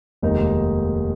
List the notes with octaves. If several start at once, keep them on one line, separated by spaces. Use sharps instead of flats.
F1 D#2 D#3 G#3 D#4